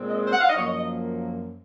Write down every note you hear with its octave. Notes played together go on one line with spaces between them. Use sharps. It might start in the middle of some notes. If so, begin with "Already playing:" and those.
Already playing: A#2 G#3 C4
D#5
C5
F#5
F5
D#5
F#2 F3 A#3 C#5
D#5
D#5